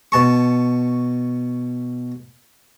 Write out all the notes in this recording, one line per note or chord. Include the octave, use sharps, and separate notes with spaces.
B2 A5 C#6